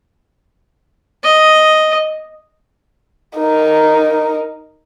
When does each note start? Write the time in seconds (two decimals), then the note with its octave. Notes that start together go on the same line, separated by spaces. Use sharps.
1.24 D#5
3.37 D#4 A#4